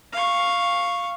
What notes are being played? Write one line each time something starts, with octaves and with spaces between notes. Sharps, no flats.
F5 C#6